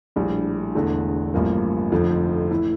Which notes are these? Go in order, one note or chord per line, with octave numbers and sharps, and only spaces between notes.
A#1 A2 G3 D4
E1 E2 D3 A3
A1 G2 F3 A#3
F1 F2 D3 F3
A2 E3 E4